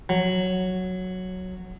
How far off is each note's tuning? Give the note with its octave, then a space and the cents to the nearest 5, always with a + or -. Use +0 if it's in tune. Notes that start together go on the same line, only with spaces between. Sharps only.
F#3 -5